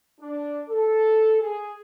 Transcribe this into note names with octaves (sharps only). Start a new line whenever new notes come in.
D4
A4
G#4